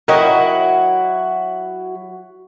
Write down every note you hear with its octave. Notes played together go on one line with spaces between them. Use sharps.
F#3 E4 F#4 A#4 D#5 G5